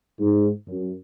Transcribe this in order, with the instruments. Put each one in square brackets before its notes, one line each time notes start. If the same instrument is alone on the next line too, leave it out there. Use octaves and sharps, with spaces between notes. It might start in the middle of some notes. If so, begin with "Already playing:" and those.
[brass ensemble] G#2
F#2